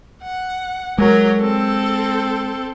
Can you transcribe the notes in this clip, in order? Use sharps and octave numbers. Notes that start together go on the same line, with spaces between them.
F#5
F#3 G#3 A#4
C4 A4